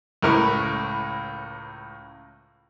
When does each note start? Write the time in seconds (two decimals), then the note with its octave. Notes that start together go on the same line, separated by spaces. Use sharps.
0.23 C#2 A2 A#4 B4 C#6